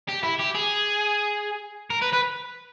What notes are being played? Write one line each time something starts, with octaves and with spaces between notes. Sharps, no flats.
G4
E4
G4
G#4
A#4
B4
B4